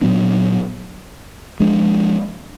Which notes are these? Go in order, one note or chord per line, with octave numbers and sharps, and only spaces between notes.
A#2 F#3 B3 D4
F3 G#3 D4